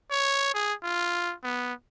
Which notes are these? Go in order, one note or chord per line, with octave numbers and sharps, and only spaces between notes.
C#5
G#4
F4
B3